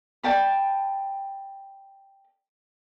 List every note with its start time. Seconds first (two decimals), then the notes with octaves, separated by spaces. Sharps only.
0.23 D5 G5 A5 B5